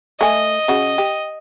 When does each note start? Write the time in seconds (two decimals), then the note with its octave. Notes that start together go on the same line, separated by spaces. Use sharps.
0.21 A3 D#5 G#5
0.68 C#3 F#4
0.98 G4